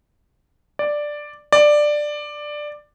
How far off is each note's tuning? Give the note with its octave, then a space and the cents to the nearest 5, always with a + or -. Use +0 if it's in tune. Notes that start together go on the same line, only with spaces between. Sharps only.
D5 +5
D5 +10